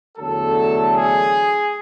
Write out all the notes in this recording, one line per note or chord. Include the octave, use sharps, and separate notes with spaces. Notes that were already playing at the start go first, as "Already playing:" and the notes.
E2 D3 F#3 A3 A4
G#4